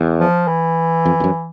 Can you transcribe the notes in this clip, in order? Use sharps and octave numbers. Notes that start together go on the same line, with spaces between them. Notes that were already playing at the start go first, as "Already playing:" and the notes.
Already playing: E2
F3
E3
F2
F2
F#2